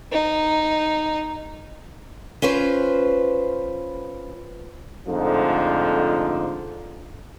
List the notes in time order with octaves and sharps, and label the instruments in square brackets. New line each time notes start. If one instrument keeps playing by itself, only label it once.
[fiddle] D#4
[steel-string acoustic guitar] C#4 F4 B4 C5
[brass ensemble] F2 G#2 D3 F3 A3 D#4